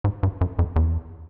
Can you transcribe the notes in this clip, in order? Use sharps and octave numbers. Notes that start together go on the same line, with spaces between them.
G#2
G2
F#2
F2
E2